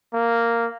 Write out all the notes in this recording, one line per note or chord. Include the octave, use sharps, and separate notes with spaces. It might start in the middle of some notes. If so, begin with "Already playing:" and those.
A#3